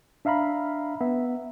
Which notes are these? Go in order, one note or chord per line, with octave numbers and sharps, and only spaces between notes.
D4 E5 F5 A#5 B5
B3 E5